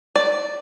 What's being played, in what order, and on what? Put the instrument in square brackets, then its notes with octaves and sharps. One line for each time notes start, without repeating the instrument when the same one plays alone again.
[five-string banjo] D5